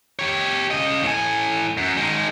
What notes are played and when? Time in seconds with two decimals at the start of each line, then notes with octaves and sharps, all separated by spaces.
0.19 G4 C#5
0.71 C#3 D#5
1.03 A2 G#5
1.77 F#2
1.98 D#3 G#3